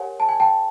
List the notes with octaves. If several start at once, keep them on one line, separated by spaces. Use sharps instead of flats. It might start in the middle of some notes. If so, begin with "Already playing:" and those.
Already playing: G4 A#4 C#5 F#5 G#5
A5
G#5
G5 A5